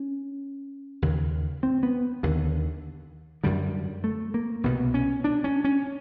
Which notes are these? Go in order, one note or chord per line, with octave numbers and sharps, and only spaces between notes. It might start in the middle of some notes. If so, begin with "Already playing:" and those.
Already playing: C#4
D#2 C#3
C4
B3
D#2 D3
F#2 D3 G3
A3
A#3
C2 B2 B3
C#4
D4
C#4
C#4